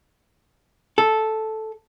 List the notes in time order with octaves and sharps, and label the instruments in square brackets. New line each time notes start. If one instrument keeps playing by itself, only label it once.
[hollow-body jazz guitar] A4